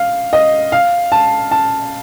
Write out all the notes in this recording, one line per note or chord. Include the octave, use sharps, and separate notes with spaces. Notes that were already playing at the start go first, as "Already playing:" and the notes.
Already playing: F5
D#5
F5
A5
A5